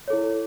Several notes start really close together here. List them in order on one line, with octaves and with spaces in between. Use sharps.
C#5 A4 E4